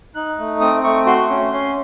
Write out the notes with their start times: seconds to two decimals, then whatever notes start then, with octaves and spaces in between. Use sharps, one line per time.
0.15 D#4 F#6
0.39 A3
0.60 C4 D#6
0.83 A3 C#6
1.06 F#4 C6
1.30 C#4
1.52 C#4